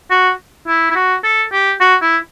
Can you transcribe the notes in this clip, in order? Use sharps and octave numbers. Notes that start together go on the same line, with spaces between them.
F#4
E4
E4
F#4
A4
G4
F#4
E4